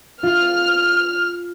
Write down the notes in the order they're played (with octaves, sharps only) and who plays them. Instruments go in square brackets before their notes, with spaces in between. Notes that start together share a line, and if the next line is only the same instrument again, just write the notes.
[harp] F4 [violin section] F6